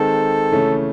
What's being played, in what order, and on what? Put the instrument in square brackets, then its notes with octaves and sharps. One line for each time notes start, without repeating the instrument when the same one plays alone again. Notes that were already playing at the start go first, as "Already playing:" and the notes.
Already playing: [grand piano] D#3 G#3 C4 [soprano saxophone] A4
[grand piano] C#3 E3 A3 C#4